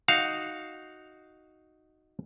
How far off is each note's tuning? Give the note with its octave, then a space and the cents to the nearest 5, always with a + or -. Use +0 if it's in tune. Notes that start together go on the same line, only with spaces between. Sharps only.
D#4 +0 F#4 +0 F5 +0